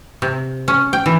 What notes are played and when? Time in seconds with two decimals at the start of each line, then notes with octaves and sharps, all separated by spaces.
0.22 C3
0.68 C#4
0.93 G5
1.06 E3